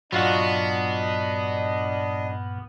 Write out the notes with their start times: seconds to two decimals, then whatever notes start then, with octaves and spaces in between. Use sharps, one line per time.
0.12 G2 A#2 F#3 B3 D4 F4 F#4 D#5